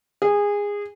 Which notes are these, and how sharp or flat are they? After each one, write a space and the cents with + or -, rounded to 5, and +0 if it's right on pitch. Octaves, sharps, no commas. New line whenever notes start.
G#4 -20